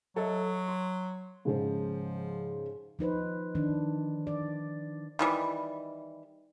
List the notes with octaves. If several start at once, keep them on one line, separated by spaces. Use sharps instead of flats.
F#3 A4 D#5 E5
C6
G#2 C#3 F3 C5
F3 D#4 B4 C5
D#3 E3 D4
D5
D#3 E3 G3